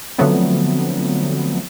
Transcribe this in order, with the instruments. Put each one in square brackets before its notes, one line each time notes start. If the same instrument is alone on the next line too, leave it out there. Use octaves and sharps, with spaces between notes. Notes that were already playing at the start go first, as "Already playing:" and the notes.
[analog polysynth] D3 F3 F#3 A3 B3 C4